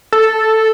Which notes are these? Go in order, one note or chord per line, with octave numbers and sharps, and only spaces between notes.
A4